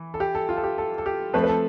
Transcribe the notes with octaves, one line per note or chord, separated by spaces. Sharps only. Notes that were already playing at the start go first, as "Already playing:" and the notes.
Already playing: E3
A4
G4
A4
F4
A4
G4
A4
A4
G4
F3 A3 C4 B4
B4
A4